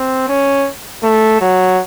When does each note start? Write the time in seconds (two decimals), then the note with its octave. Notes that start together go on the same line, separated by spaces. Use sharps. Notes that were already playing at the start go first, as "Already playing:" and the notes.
Already playing: C4
0.28 C#4
1.03 A3
1.41 F#3